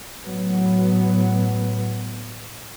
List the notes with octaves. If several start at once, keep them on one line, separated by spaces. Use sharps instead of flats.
A2 F#3 B3